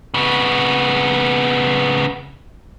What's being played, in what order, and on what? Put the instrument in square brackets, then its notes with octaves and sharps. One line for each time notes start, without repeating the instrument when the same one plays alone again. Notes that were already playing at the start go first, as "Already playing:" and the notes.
[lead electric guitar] C#3 B3